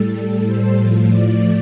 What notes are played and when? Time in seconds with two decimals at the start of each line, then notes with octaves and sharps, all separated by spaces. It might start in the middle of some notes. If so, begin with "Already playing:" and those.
Already playing: A2 G3 A4
0.46 C5
0.77 A2 F3
1.09 D5